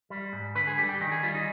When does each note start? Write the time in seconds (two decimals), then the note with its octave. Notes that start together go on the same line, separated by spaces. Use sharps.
0.10 G3
0.33 G#2
0.55 D3 B4
0.67 G#4
0.78 G3 G4
0.89 G4
1.01 D#3 D#4
1.12 G#4
1.23 G3 F4
1.35 D#4